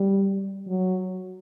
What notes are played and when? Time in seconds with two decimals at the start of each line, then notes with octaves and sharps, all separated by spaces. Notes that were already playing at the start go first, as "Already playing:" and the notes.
Already playing: G3
0.68 F#3